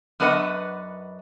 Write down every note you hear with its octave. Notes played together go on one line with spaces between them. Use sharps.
F#2 B3 D4 B4 D#5 F#5